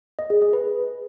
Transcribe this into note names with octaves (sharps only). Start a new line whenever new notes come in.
D#5
G#4
G#4
B4